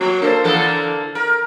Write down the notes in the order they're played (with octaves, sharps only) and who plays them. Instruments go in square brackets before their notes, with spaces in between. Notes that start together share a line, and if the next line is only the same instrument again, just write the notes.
[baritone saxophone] F#3 [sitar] A#3
[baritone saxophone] A#3 [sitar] D4 A4 C5
[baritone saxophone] D3 [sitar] E3 A#3 A4
[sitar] A#4